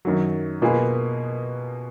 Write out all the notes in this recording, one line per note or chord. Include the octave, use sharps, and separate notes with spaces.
F#2 D#3 F#3
B2 A#3 F4 G#4 B4